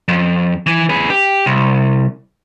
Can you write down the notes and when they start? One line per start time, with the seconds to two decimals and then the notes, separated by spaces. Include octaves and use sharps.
0.08 F2
0.66 E3
0.89 G#4 B4
1.10 G4
1.46 C2